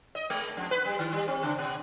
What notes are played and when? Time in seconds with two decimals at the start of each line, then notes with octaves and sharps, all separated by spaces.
0.15 D#5
0.30 G#3
0.57 F2
0.71 B4
0.85 G3
0.99 D#3
1.13 G3
1.28 C4
1.43 C#3
1.58 B2